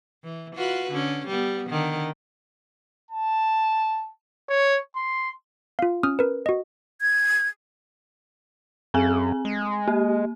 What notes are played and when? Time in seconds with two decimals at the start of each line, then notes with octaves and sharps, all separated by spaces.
0.24 E3
0.55 F4 F#4 B4
0.91 D3 C#4
1.27 G3 B3
1.69 D3 D#3
3.11 A5
4.50 C#5
4.96 C6
5.79 F4 F5
6.03 C#4 D#6 F6
6.19 A#4 B4
6.46 F#4 D#5
7.01 G#6
8.94 F#2 C4 G#4 G#5
9.45 G#3
9.88 A#3 G4